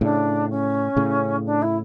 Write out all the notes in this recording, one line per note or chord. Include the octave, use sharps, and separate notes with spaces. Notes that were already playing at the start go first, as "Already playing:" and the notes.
A2 C#3 D4
C#4
A2 C#3
D4
E4